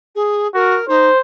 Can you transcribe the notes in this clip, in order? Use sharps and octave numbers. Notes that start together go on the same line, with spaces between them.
G#4
F#4 A#4
D#4 C5